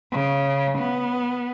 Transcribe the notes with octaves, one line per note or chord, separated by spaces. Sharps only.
C#3
B3